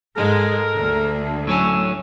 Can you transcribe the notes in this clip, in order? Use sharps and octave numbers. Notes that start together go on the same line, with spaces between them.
G#2 G#3 A4 A#4
D2
A2 F#3 C#4 E6